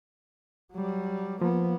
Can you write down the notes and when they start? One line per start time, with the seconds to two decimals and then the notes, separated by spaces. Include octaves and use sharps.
0.73 F#3 G3
1.41 F3 A#3 B3